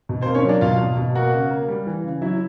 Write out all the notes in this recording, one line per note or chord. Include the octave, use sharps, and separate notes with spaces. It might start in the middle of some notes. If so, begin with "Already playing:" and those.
B2
C4 C5
A#3
C#4 C#5
F#3 D4 D5
B2 F4 F5
B2
B2
A#3 F#4 F#5
C#3
A#3
G3
E3
C#3
F#3 E4 E5